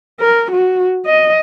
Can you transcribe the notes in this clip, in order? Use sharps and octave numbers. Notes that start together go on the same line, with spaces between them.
A#4
F#4
D#5